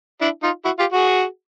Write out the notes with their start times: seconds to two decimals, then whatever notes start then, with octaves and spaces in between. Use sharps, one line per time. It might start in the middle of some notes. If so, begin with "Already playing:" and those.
0.21 D4 E4
0.43 D#4 F4
0.65 E4 F#4
0.79 F4 G4
0.93 F#4 G#4